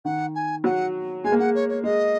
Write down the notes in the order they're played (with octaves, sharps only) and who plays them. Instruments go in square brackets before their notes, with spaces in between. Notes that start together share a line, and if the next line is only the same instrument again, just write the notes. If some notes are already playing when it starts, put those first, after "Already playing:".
[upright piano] D#3 [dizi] F#5
[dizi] G#5
[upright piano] F#3 [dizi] F#5
[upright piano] G#3 [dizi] G#5
[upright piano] A#3
[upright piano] G#3 [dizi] F#5
[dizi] C#5
C#5
[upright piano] G#3 [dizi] D#5